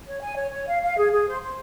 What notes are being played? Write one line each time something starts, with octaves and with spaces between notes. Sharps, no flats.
C#5
G#5
C#5
C#5
F5
F5
G#4
G#4
C5
C5